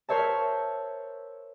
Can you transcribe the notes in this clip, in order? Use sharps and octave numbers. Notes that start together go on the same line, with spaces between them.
A#4 C5 C#5 E5 A5